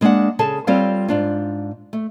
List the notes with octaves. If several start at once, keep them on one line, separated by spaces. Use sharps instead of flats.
D3 G#3 A#3 D4 F#5
C#3 G#4 A4 A5
G3 C4 F4 A4 C#5 F5
G#2 D4 F4
A3